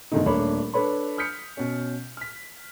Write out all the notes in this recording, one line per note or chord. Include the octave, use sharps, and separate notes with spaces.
G#2 B2 D3 D#3 A3 D#4
D#1 A3 A#3 D4 C#5 B5
D4 A4 B4 C#5 B5
D#6 F6 G6 B6 C#7
B2 C#4
F6 B6